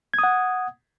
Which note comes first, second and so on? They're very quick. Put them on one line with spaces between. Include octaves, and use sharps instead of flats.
G#6 D#6 F#5